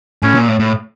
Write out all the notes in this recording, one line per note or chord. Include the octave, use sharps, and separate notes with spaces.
A2 C#4
A#2
A2
A2